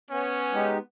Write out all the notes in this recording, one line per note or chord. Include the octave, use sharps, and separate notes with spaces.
B3 C#4
G#3 D#4 G4